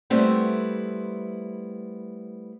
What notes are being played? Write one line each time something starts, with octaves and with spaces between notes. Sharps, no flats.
G3 A3 B3 C4 E4